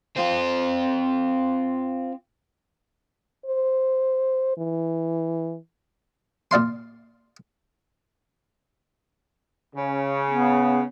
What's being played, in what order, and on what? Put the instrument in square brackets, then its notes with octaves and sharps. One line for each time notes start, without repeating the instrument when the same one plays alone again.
[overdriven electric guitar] C4 F4
[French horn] C5
E3
[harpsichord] A#2 D5 F5 C6
[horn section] C#3
[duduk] B3